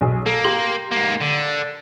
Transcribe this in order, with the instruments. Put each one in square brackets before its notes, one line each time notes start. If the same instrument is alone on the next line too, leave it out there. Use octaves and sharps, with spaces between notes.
[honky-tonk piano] B1 G#4
[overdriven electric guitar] A#3 [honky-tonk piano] A4
[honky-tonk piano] G4 C6 F#7
[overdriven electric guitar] G#2 A#3
D3